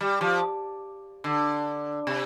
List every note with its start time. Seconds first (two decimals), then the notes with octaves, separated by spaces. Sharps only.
0.01 G3
0.21 F3
1.24 D3
2.07 C3